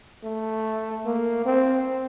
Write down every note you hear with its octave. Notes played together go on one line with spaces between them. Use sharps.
A3
A#3
C4